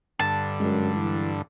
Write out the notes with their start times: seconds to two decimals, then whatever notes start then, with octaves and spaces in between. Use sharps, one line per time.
0.19 G2 D3 A5
0.60 F#2 G#3
0.95 E3